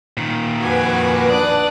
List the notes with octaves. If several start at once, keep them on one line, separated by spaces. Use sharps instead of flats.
A#2 D#3
F2 F#4 B4 F#5 G#5 D6
D4 D5 D#6 F#6